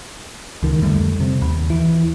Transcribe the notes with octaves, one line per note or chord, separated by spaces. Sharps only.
C#2 D#3
F2 D3 G3 A3
C3
D#2
E3